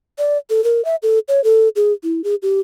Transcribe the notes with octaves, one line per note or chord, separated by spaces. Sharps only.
D5
A4
A#4
E5
A4
C#5
A4
G#4
E4
G#4
G4